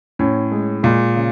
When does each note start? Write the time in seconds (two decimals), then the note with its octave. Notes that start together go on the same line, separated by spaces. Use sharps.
0.19 A2 C#4
0.52 G#3
0.83 A#2 G#3
1.15 C#3